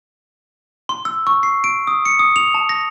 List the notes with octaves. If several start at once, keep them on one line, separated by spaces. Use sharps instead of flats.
C6
E6
C#6
C7
D7
D#6
C#7
D#6
F7
A5
A#6